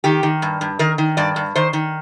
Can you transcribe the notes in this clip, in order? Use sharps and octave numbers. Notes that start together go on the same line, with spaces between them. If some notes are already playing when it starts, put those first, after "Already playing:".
D#3 G4
D#3
G2
G2
D#3 A#4
D#3
G2 D5
G2
D#3 C5
D#3